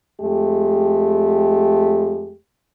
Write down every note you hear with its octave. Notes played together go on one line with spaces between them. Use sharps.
F2 G#3 A3 G4